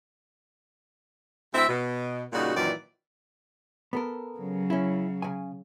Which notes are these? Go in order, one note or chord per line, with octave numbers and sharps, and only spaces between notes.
D2 C4 E4 E5
B2
A#2 C#3 G3 D#4 F#4
F#2 A#2 D#3 E3 F#3 D5
B3 A4 A#4
C#3 F#3
C#4 E4
C#3 G#5